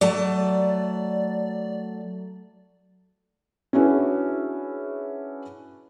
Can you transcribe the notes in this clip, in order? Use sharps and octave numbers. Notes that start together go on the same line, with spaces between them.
F#3 A3 D5 A5
C#4 D4 E4 F#4 G#4 B4